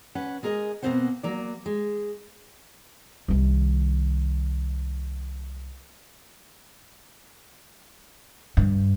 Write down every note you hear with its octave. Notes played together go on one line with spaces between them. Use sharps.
C#4 B4 F#5
G#3 G#4 A#4 C#5 D#5
B2 A#3 C4 C#4 C5 F#5
F#3 A#3 D5
G#3
C2 D#3
G2